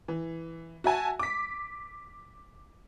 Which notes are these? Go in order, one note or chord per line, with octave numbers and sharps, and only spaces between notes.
E3
F#4 E5 G#5 A5
D6 B6